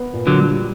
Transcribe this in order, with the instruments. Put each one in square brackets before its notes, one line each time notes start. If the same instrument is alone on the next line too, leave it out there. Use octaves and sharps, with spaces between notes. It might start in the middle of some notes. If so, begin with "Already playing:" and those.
Already playing: [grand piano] B3
A#2
[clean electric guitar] D3 F#3
[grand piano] G3